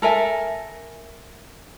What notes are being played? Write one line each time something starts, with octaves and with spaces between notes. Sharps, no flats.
A4 A#4 E5 G#5